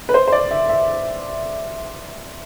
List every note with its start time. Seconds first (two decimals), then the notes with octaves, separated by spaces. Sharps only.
0.09 B4
0.14 C5
0.28 C5
0.32 D5
0.51 E5
0.69 E5